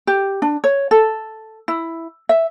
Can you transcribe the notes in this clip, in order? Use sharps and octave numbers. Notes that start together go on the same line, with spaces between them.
G4
D4
C#5
A4
E4
E5